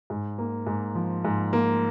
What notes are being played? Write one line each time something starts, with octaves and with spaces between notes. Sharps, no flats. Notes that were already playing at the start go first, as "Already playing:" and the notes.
G#2
A#3
G#2
F3
G#2
A#3